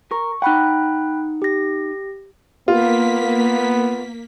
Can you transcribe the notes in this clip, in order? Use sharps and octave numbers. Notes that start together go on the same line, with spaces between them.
A#4 C#6
D#4 F#5 G5 B5 F#6
G4 A#6
A#3 B3 F4 B6